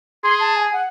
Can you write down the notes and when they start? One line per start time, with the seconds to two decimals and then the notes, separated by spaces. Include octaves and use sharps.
0.24 G#4 C6
0.40 A5
0.56 G#5
0.73 F#5